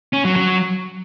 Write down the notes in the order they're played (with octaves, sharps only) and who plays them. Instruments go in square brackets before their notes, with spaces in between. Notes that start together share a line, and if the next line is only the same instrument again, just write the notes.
[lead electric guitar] C#4
F#3
F#3